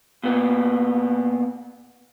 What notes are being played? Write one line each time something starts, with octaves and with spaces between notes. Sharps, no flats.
A#2 B3